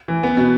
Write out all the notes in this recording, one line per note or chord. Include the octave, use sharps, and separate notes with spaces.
E3
B3
B2